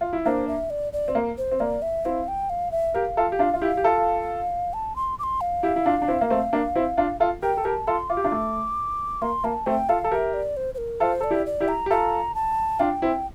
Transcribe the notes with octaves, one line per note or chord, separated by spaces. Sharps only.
F4
E4
A#3 D4 C5
E5
D5
D5
C4
A#3
C5
C4
A#3 D5
E5
C4 E4 F5
G5
F5
E5
G4 A#4 F5
F4 A4
G4
D4 F4
F4
E4 G4
G4
F4 A4
A5
C6
D6
C6
F5
E4 G4
E4
D4 F4
D4
C4 E4
A#3
A3 C4
A#3 D4
C4 E4
D4 F4
F4 A4
G4 A#4 G5
A4
G4 A#4 A5
F4 A4 C6
F4 D6
G4
D4 F4
A3
A#3 C6
A#3 A5
A3 C4 G5
F4 A4 F5
A4
G4 A#4 E5 F5
D5
C5
C5
A#4
F4 A4 C5
A4 D5
E4 G4
D5
E4 G4
A#5
G4
F4 A4 A#5
A5
D4 F4 G5
C4 E4